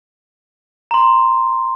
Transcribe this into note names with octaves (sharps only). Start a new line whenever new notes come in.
A#5 C6